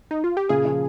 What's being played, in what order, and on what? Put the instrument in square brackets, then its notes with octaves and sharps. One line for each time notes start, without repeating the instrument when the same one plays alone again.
[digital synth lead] D#4
F4
G4
[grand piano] A#2 C#3 [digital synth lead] G#4
[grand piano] C#3 F3